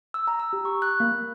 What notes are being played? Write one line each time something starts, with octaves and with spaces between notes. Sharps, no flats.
E6
A#5
E6
G4
C#6
F#6
A#3